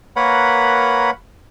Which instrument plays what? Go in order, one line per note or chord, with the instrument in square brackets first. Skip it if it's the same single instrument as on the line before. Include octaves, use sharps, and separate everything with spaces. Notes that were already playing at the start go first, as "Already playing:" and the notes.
[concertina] A#3 A#4 B4 C#5 F#5 B5